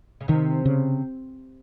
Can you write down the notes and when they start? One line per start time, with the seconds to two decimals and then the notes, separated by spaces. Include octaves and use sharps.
0.21 C#3
0.28 C3 D#3
0.66 C#3